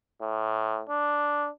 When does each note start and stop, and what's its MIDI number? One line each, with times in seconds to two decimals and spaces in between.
0.22 0.82 45
0.89 1.48 62